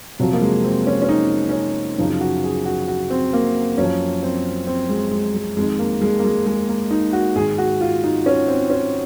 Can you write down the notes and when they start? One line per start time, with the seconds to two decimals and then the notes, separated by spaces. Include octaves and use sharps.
0.19 F2 C3 F3 F#3
0.33 A#3
0.42 G#3
0.64 C4
0.87 C#4
1.02 C#4
1.09 D#4
1.49 C#4
1.53 D#4
1.98 F#2 C#3 F3 D#4
2.21 F#4
2.44 G#4
2.66 F#4
2.88 F#4
3.10 C4
3.33 A#3
3.78 F#2 F3 C#4
4.23 C4
4.67 C4
4.89 G#3
5.11 G#3
5.34 G#3
5.57 F2 D#3 G#3
5.79 A#3
6.01 G#3
6.19 A#3
6.24 G#3
6.46 G#3
6.68 A#3
6.91 D#4
7.13 F#4
7.35 G#2 D#3 G#4
7.58 F#4
7.81 F4
8.04 D#4
8.26 C#4
8.48 C4
8.70 C#4